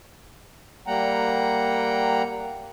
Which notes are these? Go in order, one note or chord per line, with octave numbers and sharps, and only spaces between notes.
G3 A#3 F#5 G5 A#5